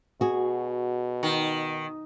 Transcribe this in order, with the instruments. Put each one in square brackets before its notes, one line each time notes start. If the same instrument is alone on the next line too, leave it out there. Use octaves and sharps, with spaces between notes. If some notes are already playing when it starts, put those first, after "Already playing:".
[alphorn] B2 [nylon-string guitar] F#4 G#4
[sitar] D#3